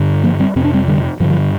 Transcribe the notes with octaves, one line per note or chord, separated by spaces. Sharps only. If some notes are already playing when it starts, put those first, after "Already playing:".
Already playing: G2 D3
F3 A#3
G3 C4
F2 C3 C4
D4
G3 C4
D3 G3
G2 D3 F3
F3